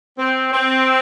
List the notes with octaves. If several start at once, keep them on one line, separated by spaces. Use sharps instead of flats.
C4
C4